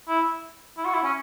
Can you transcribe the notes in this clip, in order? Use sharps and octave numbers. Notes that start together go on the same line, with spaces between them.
E4
E4
F#4
E4
C#4